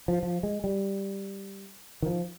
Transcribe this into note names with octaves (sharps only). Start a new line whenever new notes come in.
F3
F3
G#3
G3
D#3
F3